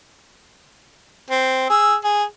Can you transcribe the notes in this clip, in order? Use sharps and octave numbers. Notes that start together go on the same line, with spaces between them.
C4
G#4 E6
G#4